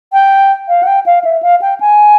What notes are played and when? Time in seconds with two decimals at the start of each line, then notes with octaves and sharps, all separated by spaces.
0.13 G5
0.68 F5
0.83 F#5
0.87 G5
1.06 F5
1.24 E5
1.43 F5
1.62 G5
1.80 G#5